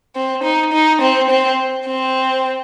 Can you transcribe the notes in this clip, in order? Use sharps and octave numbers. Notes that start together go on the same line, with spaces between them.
C4
D#4
D#4
C4
C4
C4